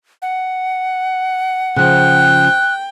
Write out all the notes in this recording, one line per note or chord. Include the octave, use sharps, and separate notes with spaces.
F#5
C#3 F3 G5 F#6